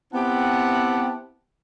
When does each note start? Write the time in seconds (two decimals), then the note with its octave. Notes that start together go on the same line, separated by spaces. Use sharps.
0.13 B3 C4 E4 G4 F#5 A5